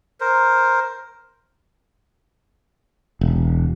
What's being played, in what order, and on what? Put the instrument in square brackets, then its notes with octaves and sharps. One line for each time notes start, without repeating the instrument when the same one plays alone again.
[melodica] A#4 C5
[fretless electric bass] E1